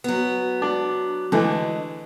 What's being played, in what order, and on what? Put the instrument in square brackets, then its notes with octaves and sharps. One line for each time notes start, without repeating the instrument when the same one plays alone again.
[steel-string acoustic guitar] F#3 B3
[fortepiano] D4
[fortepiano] D3 E3 A3 [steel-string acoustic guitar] G#3